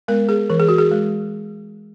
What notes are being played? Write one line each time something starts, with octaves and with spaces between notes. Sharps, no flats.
G#3 B3 A#4
G#4
E3 A#4
G#4
F#4
G#4
G#3